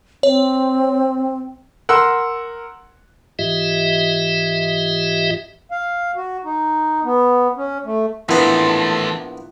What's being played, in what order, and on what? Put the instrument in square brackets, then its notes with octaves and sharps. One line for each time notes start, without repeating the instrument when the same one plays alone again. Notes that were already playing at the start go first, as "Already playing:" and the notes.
[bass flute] C4 [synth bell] C#5
[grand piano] A#4 F#5 C6 E6
[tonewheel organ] G#2 E3 F4 G4 D#5 E5
[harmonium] F5
F#4
D#4
B3
C#4
A3
[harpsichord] A#1 B3 [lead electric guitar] E3 A3 [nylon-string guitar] E4 F5 [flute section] A5 C6